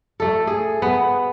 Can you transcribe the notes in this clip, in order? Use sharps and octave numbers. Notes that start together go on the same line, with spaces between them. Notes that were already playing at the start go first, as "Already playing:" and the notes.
A3 A4
G#4
B3